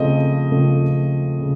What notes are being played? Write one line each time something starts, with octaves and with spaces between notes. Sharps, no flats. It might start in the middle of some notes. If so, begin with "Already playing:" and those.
Already playing: C#3 F3 A3 C4 D#5
C#3 F3 A3 C4
C#3